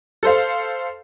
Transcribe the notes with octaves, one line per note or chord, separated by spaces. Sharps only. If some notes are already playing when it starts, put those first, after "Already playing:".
A4 C5 F5